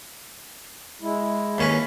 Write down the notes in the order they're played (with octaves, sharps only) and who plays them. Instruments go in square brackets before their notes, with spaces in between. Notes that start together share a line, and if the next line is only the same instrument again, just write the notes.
[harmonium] G#3 E4
[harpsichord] D#2 C#4 B4